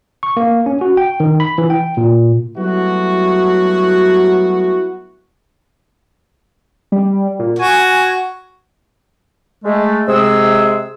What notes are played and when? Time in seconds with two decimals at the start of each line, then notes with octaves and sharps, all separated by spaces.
0.23 C#6
0.37 A#3
0.66 C#4
0.81 F#4
0.97 G5
1.20 D#3
1.40 B5
1.58 E3
1.70 G5
1.97 A#2
2.57 F#3 G3 A3 B3 E4 F#4
6.92 G3
7.39 A#2
7.59 F#4 G#5
9.64 G#3 A3
10.07 C3 G#3 G#4 E6